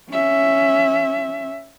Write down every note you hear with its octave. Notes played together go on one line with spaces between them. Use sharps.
C#4 E5